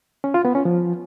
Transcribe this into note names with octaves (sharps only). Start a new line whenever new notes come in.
C#4
F4
B3
C#4
F3